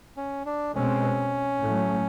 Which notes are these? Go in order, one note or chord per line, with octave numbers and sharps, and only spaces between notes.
C#4
D4
B2 G#3 C4 C#4
A2 F#3 A3